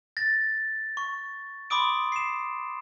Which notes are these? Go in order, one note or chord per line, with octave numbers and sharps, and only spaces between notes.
A6 A#6
C#6
B5 C6 D6 D#6 D7
C7 E7